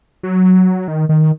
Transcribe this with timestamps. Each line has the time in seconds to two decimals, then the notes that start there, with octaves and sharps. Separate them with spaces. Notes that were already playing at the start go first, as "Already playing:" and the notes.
0.23 F#3
0.88 D#3
1.09 D#3